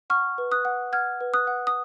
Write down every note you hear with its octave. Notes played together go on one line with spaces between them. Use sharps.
F#5 C#6 F6
B4
D#6 F#6
F#5
F#5 F6 G#6
B4
D#6 F#6
F#5
D#6